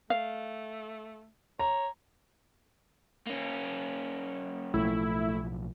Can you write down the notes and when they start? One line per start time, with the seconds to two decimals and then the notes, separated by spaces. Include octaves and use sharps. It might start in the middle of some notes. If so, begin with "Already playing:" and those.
0.10 A3 F5
1.59 C#5 A#5
3.27 A#3 C#4
4.74 B1 A2 F3 A3 E4